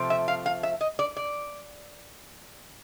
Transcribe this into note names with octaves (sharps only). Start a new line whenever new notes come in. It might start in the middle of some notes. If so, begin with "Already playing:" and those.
Already playing: C3 F3 A3 C4
E5
F5
F5
E5
D#5
D5
D5